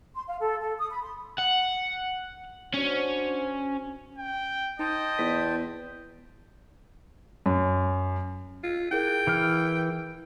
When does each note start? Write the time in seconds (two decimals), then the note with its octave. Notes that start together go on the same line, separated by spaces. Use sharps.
0.14 C6
0.27 F5
0.41 A4
0.60 A4
0.78 D#6
0.90 B5
1.02 C6
1.38 F#5
2.74 C#4 D4 F#4 C5
4.18 G5
4.79 D#4 C5 D#5 G5 A5
5.18 E2 B3 B6
7.46 F#2
8.64 F4
8.91 E4 G#4 A#4 G5
9.27 E3 F6